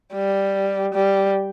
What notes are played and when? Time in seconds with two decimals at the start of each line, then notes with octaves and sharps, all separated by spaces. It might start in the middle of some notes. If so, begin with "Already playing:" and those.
0.14 G3
0.94 G3